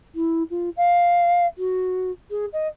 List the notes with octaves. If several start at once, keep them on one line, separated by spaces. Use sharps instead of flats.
E4
F4
F5
F#4
G#4
D#5